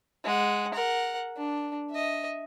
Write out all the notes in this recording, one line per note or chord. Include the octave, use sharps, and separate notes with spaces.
G#3 F#5
A#4 F#5
D4
D#5 E5